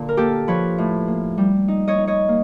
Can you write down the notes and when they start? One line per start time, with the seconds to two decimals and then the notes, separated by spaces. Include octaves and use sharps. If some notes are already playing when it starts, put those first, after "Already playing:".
Already playing: A#2 D3
0.09 A#4
0.17 A#3 G4 A4
0.48 F3 B4 C#5
0.78 A2
1.08 A#3
1.38 G3
1.68 D#4
1.88 C#5 D#5
1.98 D#4
2.07 C#5 D#5
2.28 A#3